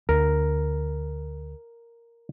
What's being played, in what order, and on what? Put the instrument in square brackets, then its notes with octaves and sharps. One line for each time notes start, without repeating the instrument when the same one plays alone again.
[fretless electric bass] D2 [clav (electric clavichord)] A#4